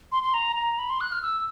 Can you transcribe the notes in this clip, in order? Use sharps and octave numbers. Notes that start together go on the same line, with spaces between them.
C6
C6
A#5
A#5
B5
C6
F#6
F6
E6